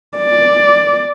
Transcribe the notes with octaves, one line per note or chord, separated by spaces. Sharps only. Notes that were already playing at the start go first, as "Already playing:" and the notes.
D5